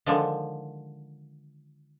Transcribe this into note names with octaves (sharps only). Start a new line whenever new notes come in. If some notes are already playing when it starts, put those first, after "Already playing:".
D3 D#3 F3 G#3